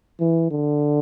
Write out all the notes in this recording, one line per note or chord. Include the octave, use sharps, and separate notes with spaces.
E3
D3